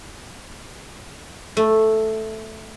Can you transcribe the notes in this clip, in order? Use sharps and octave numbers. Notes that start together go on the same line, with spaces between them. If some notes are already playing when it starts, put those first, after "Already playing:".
A3